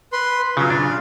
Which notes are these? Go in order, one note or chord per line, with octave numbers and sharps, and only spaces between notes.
B4 C6
C#3 F#3 F4
D4